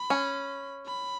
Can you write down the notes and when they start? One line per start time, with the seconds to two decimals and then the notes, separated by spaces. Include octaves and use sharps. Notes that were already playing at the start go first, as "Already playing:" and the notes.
Already playing: B5
0.10 C#4
0.87 B5